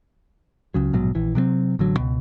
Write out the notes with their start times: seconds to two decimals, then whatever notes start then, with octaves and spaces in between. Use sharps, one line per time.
0.74 C#2 C#3 F#3
0.93 A#1 G#2 B2 F#3
1.15 A#1 E3
1.35 C3 F#3 A3 C4
1.79 A1 D3 F#3
1.97 C#2 B2